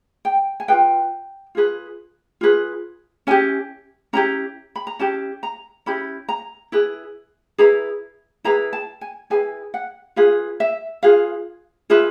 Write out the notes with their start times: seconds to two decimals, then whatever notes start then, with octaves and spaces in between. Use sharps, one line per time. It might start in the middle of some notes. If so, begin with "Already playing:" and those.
0.25 G5
0.60 G#5
0.68 G#4 B4 G5
0.72 F4
1.55 F4 G#4 B4
2.41 F4 G#4 B4
3.27 C#4 E4 G4 G#5
4.13 C#4 E4 G4 A#5
4.76 B5
4.87 A#5
4.99 C#4 E4 G4 A5
5.43 A#5
5.86 C#4 E4 G4 B5
6.29 A#5
6.72 E4 G#4 B4
7.58 E4 G#4 B4 A#5
8.44 E4 G#4 B4 A#5
8.73 A5
9.01 G#5
9.30 E4 G#4 B4 G#5
9.74 F#5
10.16 F4 G#4 B4 F5
10.60 E5
11.03 F4 G#4 B4 F5
11.90 F4 G#4 B4 E5